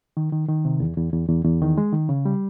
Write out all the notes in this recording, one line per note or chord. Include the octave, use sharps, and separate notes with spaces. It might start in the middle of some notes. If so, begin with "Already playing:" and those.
D#3
D#3
D#3
C3
E2
E2
E2
E2
E2
D#3
G#3
D#3
C#3
G3